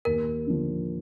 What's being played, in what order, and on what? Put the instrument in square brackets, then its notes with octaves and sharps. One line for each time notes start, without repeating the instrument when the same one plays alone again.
[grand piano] D#2 [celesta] A#4
[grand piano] D3 F3